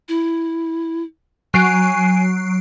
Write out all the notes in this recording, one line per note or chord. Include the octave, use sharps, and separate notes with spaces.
E4
F#3 G#5 C7 D7